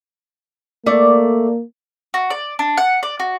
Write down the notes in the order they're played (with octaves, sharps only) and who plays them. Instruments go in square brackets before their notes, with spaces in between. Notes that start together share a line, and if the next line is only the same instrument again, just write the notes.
[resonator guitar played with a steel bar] A3 D5 [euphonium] A#3
[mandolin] F#4
D5
D4
F#5
D5
F#4